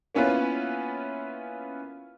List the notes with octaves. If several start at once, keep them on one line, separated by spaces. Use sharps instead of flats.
A#3 B3 C#4 E4 F4 B4